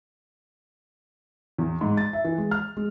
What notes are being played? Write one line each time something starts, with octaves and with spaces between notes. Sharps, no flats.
E2
G#2
A6
E5
E3
G#3
F6
G#3